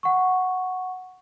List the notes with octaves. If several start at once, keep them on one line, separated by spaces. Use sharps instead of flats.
F#5 C#6